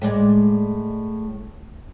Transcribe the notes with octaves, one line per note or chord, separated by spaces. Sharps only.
A2 G#3 D5